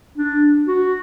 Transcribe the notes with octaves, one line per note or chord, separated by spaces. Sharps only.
D4
F#4